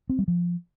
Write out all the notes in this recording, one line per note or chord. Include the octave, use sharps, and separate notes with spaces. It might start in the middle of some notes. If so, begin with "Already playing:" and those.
C4
G3
F3